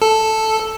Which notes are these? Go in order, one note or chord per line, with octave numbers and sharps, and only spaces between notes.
A4